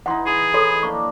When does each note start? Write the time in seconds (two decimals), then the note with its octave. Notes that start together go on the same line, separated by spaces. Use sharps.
0.06 E3 D#4 F#5 C6
0.27 G#4 B5
0.54 A4 C#5 B5 C6
0.83 A#3 D4 C#6